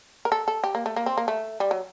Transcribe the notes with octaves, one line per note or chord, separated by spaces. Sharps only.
A#4
A4
A4
G4
A#3
A3
A#3
C4
A#3
A3
G3
F#3